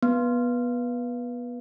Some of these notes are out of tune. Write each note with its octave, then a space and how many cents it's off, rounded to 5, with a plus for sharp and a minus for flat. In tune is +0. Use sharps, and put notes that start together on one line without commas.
B3 -20